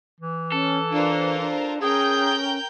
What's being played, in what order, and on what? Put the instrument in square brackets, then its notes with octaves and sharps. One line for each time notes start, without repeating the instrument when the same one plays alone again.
[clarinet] E3
[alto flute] C#4 [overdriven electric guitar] A4
[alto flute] D4 [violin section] F4 A#4 C5
[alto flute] D4
[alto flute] C#4 [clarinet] G#4 [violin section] A#4 G5 G6